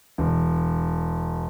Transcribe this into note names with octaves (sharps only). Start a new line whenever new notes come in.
E1